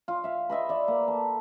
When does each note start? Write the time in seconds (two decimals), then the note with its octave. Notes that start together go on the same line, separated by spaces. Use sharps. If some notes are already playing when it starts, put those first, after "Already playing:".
0.08 F4
0.24 E5 F5
0.49 B4 D#5 E5 C6
0.69 D5 E5
0.88 A#3
1.08 A4